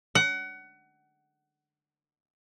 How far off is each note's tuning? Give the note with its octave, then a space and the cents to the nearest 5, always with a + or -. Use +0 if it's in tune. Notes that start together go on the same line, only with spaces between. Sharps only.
F#5 +25